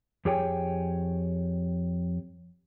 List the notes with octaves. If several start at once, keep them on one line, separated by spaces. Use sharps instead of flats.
F2 G4 G#4 C#5 G5 G#5